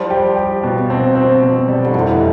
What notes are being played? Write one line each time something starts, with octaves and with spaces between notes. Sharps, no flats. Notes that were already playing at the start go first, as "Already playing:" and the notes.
Already playing: F3 G3
G4
G4
B2
C4
C4
B2
G3
D3
F1 E3